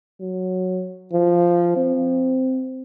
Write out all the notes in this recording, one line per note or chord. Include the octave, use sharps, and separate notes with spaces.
F#3
F3
C4